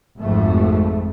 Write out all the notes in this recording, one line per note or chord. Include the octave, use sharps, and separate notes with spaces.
G#1 F2 A3